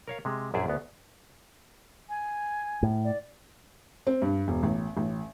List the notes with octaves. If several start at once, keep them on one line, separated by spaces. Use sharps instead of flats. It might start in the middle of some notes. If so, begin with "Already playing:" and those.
A#4 C#5 F5
C3 G#3
A#1 F#2 E4 G#4 D5 E5
D2 B3
G#5
A2
D5
C4
G2
E1
A1
A1